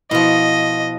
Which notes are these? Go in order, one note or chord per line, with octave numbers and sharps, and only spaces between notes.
B2 F3 E4 D#5